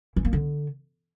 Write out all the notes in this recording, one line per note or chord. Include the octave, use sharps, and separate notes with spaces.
E3
A#3
D3